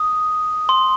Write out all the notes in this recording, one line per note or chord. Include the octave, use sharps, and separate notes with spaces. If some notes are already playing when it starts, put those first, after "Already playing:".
Already playing: D#6
C6